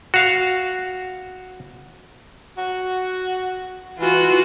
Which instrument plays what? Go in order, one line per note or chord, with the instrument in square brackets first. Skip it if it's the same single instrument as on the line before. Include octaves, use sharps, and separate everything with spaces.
[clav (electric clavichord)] F#4 F5
[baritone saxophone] F#4
[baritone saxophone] E3 [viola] F4 F#4